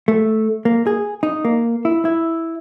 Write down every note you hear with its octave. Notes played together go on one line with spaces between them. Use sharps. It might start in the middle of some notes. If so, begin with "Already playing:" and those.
A3
A#3
G#4
D#4
A#3
E4
E4